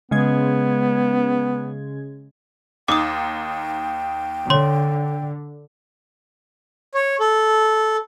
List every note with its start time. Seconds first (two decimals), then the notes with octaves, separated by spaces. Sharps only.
0.11 C#3 G#3 B3 G#6
2.88 D#2 D#4 G5 D6 D#6
4.50 D3 C#5 C6
6.94 C#5
7.20 A4